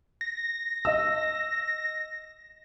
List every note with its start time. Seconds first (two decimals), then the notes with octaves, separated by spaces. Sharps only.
0.21 A#6
0.85 D#5 E6